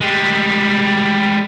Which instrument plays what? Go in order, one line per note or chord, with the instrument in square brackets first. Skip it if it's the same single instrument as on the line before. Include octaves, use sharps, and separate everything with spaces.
[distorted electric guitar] G3 G#3